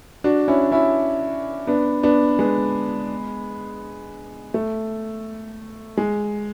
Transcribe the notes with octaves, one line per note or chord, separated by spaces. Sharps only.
D4 F#4
C#4 E4
C#4 E4
B3 D4
B3 D4
G#3 B3
A3
G#3